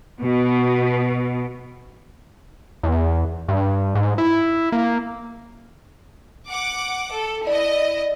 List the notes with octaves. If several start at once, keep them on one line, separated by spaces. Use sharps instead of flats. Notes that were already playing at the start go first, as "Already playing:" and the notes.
B2
E2
G2
G#2
E4
A#3
F#5 D6
A4
E4 D5 D#5